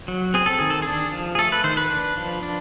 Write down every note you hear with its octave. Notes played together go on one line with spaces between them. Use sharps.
F#3
C4 G#4
A4
D#3 G#4
A4
D4 G#4
F3
G#4
A3 A4
B4
D#3 C5
B4
D4
F3
D4